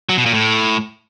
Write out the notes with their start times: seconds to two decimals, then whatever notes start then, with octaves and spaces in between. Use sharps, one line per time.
0.09 F#3
0.18 B2
0.26 A#2
0.34 A2